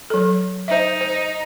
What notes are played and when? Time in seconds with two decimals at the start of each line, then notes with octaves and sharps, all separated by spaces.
0.10 F#3 A4
0.68 D#4 C5 E5
1.01 C5